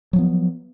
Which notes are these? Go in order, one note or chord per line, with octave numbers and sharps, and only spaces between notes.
F3 F#3 B3